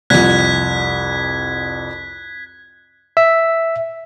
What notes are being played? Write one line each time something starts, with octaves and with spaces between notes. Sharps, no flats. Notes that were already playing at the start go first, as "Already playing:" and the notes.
C2 F2 F#6 G#6 B6
E5